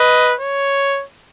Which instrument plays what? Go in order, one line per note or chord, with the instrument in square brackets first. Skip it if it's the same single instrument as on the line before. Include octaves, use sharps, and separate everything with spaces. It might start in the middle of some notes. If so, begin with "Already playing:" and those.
Already playing: [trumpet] B4 [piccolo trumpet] D#5
[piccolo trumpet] C#5